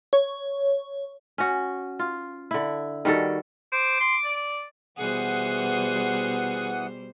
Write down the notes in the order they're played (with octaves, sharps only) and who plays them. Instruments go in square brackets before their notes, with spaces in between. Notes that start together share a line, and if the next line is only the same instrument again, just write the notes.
[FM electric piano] C#5
[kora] C#4 F#4
F4
D3 E4
D#3 G3 F#4 A4
[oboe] C5 [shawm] D6
[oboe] C6
D5
[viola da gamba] B2 G3 C5 [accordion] E3 F#5 D#6 [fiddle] G#4